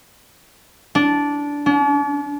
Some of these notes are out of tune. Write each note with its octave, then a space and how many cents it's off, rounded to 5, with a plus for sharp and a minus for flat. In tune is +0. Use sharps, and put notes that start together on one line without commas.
D4 -15
D4 -45